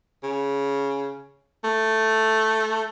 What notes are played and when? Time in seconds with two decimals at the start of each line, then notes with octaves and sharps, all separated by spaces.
0.23 C#3
1.64 A3